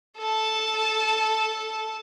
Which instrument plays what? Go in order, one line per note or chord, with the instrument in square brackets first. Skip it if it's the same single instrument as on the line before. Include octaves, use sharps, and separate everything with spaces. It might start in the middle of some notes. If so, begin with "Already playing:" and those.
[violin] A4 A5